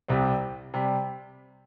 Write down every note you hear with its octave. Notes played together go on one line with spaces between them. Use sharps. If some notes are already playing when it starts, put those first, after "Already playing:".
C2 C3 G3 C4
C3 G3